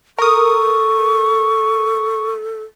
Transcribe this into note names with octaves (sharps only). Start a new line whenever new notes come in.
A4 A#4 C#6 D#6